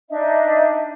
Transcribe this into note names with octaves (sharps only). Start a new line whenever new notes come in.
D4 D#4 D#5 E5